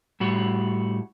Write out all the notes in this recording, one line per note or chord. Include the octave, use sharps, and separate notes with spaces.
A2 G3 F#4